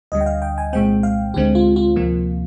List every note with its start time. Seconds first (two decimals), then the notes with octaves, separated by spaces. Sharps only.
0.12 D2 D3 G3 D#5
0.21 G5
0.26 F5
0.42 G5
0.58 G#5
0.73 C2 A#2 G#3 C4 G5
1.03 F5
1.34 D2 D3 G#3 C4 G4
1.55 F4
1.76 F4
1.96 D2 C3 F3 A#3